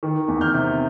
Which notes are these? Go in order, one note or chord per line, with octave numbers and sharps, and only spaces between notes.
D#3
E2
F6 G6
C3